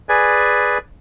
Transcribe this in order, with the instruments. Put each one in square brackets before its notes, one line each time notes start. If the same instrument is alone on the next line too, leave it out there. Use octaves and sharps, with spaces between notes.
[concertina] G#4 B4 D5 G#5